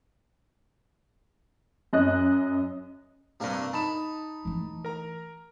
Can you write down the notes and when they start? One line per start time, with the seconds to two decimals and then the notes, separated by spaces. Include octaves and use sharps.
1.93 F#2 D#5 F#6
3.40 G2 C3 A#3 D4 A#4
3.73 D#4 A5 B5 E7
4.45 E3 A3
4.85 A#4 A#5